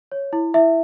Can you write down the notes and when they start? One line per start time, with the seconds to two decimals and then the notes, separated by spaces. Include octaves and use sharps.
0.12 C#5
0.33 E4
0.54 E4 E5